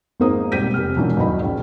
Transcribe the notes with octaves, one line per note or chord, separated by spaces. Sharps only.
G#1 F2 G#2 A#3 C5 D#6
E1 G3 C4 G6 B6 D#7
F1 G4 F6
E1 E3 F3 C#4 D4
G1 D#2 F#3 D#5 B5
A#1 C#3